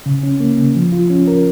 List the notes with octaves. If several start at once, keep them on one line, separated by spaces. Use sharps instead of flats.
C#3
C#4
A#3
C#3
F3
F4
C#4
A#4